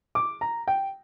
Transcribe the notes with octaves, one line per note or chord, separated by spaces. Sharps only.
D6
A#5
G5